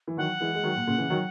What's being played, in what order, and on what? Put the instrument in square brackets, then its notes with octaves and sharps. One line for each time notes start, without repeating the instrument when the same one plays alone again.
[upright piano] E3
[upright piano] D#3 F#3 [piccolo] F#5
[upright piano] E3 G#3
G#3
D#3 F#3
A#2
A#2 C#3
C#3 E3
D#3 F#3